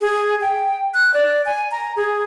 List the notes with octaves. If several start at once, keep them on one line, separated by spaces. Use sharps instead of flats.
G#4
G5
F#6
D5
G#5
A#5
G#4